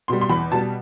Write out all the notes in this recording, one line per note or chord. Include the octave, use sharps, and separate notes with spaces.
B2 G3 C6
C6
E2 B5
B2 G3 A5